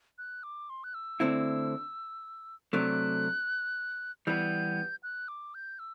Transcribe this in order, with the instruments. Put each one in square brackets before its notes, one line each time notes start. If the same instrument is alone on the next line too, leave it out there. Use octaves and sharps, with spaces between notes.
[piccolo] F#6
D6
C6
F#6
E6
[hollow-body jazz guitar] D3 A3 C4 E4
[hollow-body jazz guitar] C3 F#3 A3 D4 [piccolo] F#6
[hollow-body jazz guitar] E3 G3 B3 [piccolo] G6
[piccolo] F#6
D6
G6
E6